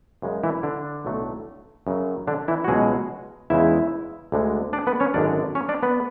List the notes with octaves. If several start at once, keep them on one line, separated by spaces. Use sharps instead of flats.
F#2 C#3 G#3
E3 E4
D3 D4
B1 A2 F#3 A3
F#2 C#3 F#3
D3 D4
E3 E4
F#4
C#2 B2 F#3 G#3 G#4
E2 C#3 G#3 E4 E5
D2 D3 G#3
D4 D5
B3 B4
C#4 C#5
G#1 F#2 D3 G#3 D4 D5
C#4 C#5
D4 D5
B3 B4